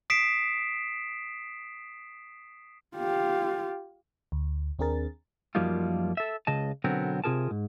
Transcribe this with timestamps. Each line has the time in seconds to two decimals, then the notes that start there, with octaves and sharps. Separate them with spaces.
0.10 D#6 B6 C7 D7 E7
2.96 F4 G4
4.32 D2
4.79 D#2 C4 D4 G#4 A#4 A6
5.55 F#2 F3 G3 A#3 D#4 F4
6.17 A4 E5
6.47 C#2 C#3 D#5 A5
6.84 B1 D3 F#3 B3 C4 A#4
7.24 C3 F4 G#4 A#4 A5
7.51 G#2